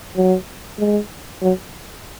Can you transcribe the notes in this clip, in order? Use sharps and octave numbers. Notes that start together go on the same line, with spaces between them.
F#3
G#3
F#3